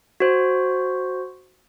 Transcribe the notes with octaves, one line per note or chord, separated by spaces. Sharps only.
F#4 C5